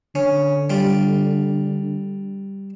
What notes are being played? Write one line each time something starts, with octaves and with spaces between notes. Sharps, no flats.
D3 C#4
G3 F4